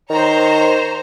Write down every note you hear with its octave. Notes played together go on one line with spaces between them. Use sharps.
D#3 C5 C#5 A#5